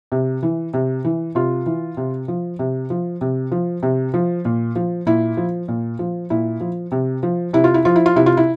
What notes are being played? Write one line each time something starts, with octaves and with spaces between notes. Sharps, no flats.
C3
E3
C3
E3
C3 F4
E3
C3
F3
C3
F3
C3
F3
C3
F3
A#2
F3
A#2 E4
F3
A#2
F3
A#2 E4
F3
C3
F3
C3 E4
F4
E4
F3 F4
E4
F4
C3 E4
F4
E4